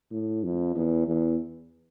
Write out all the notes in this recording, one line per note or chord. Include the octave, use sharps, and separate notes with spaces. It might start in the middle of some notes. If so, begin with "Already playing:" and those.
A2
F2
E2
E2